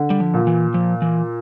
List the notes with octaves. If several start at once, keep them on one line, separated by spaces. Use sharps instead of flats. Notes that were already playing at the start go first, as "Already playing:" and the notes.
Already playing: D3
G3
F3
A#2
E3
F3
E3